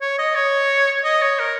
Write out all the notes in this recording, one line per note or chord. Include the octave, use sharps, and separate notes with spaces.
C#5
D#5
C#5
D#5
C#5
A#4